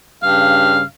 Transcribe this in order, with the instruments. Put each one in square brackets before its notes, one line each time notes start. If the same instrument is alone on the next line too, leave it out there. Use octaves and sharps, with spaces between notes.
[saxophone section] G2 C#3 F5